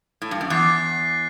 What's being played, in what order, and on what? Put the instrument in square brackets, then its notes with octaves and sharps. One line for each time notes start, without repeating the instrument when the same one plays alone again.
[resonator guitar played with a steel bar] A2
G2
F#2
[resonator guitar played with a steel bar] E2 [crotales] F#6 A6 C7